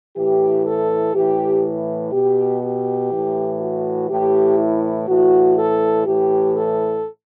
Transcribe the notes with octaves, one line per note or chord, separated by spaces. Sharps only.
A2 E3 G4
A4
A2 E3 G4
B2 G4
G4
A2 E3
F#4
A2 E3 G4
E4
A2 E3 F#4
A4
A2 E3 G4
A4